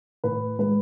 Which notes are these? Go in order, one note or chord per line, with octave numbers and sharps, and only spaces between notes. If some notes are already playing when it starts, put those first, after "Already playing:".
A2 B4
G#3 B4